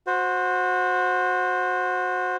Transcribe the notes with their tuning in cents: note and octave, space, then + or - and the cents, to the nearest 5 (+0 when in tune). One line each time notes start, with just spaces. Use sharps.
F#4 -20 C5 +0